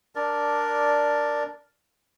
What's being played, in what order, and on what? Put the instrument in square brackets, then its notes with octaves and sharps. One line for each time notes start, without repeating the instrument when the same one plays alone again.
[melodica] D4 A#4 D5